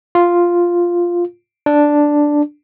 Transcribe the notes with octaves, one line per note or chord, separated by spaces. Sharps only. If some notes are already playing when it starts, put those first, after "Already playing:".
F4
D4